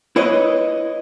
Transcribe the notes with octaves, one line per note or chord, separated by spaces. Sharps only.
E4 B4 C#5 D#5